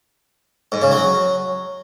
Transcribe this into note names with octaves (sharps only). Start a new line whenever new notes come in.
G#2
C#3
F#3